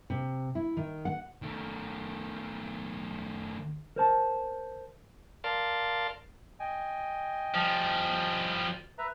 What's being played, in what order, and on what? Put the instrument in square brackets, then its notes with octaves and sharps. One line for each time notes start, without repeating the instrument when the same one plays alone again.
[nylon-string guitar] C3
E4
D#3
F#5
[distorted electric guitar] D#3 A3
[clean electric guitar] A#4 C5 A5
[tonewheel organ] A#4 D5 F5 A5 C6
[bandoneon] D#5 G5 G#5
[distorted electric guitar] F3 G3
[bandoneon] B4 E5 A#5